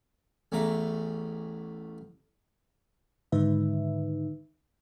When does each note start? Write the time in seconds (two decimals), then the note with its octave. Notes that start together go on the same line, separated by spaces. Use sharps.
0.52 A1 E2 A3 A#5
3.32 G#2 D3 D#3 D#4 B4 E5